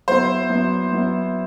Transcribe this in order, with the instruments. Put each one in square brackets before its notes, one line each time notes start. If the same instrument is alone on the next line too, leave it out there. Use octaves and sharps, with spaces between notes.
[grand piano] F#3 B3 E4 [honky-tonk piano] C5
[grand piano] F#3 B3 E4
F#3 B3 E4